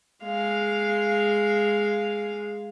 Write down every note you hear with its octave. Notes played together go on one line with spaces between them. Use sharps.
G#3 F5